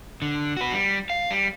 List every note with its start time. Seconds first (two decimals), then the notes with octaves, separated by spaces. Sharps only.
0.22 D3
0.57 F#4 B4
0.72 G3
1.10 F5
1.31 G3